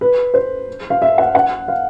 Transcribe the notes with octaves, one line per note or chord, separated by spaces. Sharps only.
B4
C5
F5
E5
F#5
F#5
F5